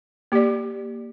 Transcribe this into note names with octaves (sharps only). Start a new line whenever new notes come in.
A#3 G4 D5